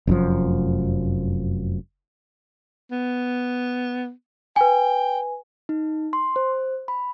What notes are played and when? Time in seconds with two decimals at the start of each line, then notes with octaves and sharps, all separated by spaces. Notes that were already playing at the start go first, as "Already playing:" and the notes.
0.07 F1 F#2 A#2 F3
2.91 B3
4.56 B4 G5 G#5
5.69 D#4
6.13 C6
6.36 C5
6.88 B5